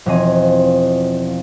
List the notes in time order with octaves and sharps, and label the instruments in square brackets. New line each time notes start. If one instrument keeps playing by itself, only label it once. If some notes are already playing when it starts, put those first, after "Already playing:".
[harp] E1 F3 C4 D#5 G#5 D#7